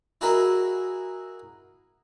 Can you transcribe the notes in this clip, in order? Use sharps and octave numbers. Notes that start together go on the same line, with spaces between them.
E4 F#4 G#4 A#4 D#5 E5